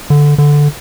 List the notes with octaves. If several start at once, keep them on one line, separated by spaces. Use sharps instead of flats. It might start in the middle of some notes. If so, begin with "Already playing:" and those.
D3
D3